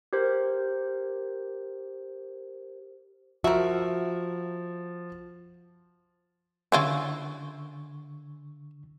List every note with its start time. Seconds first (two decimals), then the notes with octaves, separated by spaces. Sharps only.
0.13 G4 A#4 C5
3.44 F3 F#4 A#4 E5
6.72 D3 C#4 E4 F4 C#6 E6